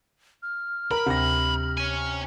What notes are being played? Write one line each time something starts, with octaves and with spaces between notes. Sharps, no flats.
F6
A#4 B5
D2 C3 A#6
C#5 G#5